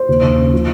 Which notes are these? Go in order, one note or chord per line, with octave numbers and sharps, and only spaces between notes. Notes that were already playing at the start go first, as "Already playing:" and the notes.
Already playing: C5
D#2
D#2
C#3
F3